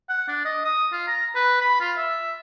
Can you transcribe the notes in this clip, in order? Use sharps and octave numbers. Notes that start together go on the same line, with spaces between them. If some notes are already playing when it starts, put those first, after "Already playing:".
F#5
D4
D#5
D#6
F4
A#5
B4
B5
F4
E5